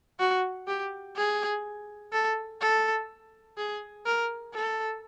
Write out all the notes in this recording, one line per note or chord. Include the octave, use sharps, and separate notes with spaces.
F#4
G4
G#4
A4
A4
G#4
A#4
A4